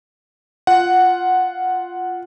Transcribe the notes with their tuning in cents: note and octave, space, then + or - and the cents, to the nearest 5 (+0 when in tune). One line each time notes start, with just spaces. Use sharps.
F4 +0 F#5 +0